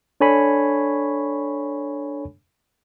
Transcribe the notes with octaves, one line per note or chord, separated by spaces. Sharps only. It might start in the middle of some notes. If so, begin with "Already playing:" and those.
D4 A4 C#5 G#5 B5 C#6